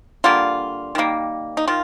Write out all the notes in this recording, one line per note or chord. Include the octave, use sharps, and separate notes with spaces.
D3 G3 A#3 F4
D#3 G3 A#3
D#4
D#3 F4